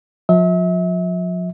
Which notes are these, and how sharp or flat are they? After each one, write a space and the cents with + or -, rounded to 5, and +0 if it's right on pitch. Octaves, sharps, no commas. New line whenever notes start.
F3 +40 E5 -35